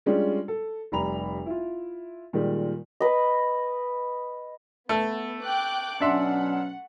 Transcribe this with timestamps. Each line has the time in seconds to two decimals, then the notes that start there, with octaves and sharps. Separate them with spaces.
0.06 G3 G#3 C#4 D4 F4
0.48 A4
0.92 F1 G3 A#5 B5 F7
1.46 E4 F4
2.33 A#2 D#3 G3 G#3
3.00 B4 D#5
4.89 A3 B3 A4
5.43 G5 D6 F#6
6.01 B2 F#3 C#4 D4 E5 F#5 C6